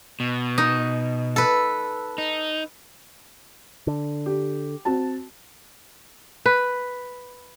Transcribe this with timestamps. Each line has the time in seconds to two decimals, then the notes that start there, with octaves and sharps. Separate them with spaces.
0.20 B2
0.58 D#4
1.36 A4 B4
2.18 D#4
3.87 D3
4.26 G4
4.85 C4 F#4 A5
6.46 B4